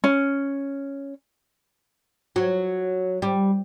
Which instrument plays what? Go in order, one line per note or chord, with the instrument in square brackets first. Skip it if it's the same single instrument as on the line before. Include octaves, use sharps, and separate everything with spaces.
[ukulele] C#4
[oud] F#3
G3